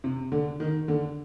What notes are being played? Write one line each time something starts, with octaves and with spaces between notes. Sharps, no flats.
C3
D3
D#3
D3